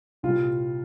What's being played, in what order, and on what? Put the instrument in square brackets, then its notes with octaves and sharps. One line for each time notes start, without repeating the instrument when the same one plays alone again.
[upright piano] C2 A#2 G3 F4